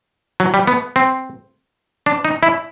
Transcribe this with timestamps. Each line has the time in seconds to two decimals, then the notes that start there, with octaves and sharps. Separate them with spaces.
0.40 F#3
0.54 G3
0.67 B3
0.96 C4
2.06 D4
2.25 D#4
2.43 E4